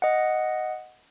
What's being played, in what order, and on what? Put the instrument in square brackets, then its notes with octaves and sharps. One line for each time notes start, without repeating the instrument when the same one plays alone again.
[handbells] D#5 F#5